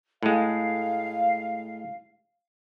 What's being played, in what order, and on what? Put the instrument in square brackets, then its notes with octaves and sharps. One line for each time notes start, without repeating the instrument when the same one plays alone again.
[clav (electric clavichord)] A2 G#3 [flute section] F5